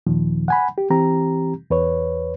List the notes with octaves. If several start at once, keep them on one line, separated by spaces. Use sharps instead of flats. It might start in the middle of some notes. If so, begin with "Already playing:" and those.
D#2 A#2 D#3 F3
F#5 G#5 B5
G4
E3 C4 G4 A#5
E2 B4 C#5